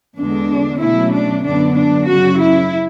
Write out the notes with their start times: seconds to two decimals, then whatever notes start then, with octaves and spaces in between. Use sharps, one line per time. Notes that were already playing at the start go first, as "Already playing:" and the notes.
0.17 E2 D3 G#3 D4
0.81 B2 F#3 A3 C#4 E4
1.13 D4
1.44 F#2 D3 F#3 B3 D4
1.76 D4
2.07 F#2 C#3 F#3 C#4 F#4
2.40 E4